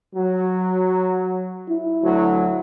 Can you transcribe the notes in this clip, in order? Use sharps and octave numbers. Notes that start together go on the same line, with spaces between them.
F#3
E4
D2 F#3